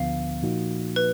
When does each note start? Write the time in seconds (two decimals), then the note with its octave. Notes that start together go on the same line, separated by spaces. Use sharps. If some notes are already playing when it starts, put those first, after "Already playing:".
Already playing: D2 D3 F3 B3 F5
0.42 A#2 F3 A#3 D#4 F#4
0.96 B4